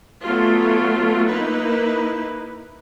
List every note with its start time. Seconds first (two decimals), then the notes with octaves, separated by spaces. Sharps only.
0.23 F#3 A3 B3 F4
1.28 A#3 D#4 E4 B4